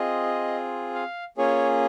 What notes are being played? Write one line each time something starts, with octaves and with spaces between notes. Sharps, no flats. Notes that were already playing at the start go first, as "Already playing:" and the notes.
Already playing: C4 F4 G#4 D#5
F5
A#3 C#4 F4 G#4 C#5